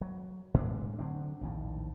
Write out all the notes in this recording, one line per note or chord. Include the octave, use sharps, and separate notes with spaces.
F#3
A2 G#3 C4 D4
D3 F#3 C4 D4
A#1 D#2 A2